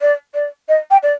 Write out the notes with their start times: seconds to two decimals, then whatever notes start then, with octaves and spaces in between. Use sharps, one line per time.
0.01 D5
0.34 D5
0.68 D#5
0.90 G5
1.02 D5